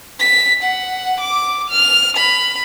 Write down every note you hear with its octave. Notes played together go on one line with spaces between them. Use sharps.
B6
F#5
D6
F6
B5